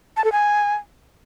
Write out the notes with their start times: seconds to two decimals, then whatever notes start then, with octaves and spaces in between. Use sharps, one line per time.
0.17 A5
0.24 A4
0.32 G#5